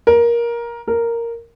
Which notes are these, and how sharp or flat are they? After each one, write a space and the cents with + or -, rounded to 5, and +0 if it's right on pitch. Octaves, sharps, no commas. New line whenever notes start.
A#4 +15
A#4 -5